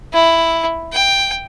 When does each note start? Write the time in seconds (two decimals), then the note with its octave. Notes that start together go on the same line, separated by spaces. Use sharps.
0.13 E4
0.93 G5